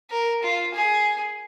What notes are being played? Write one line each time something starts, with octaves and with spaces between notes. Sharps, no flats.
A#4
F4
G#4